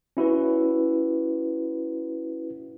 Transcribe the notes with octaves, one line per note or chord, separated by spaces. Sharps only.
C#4 E4 F#4 B4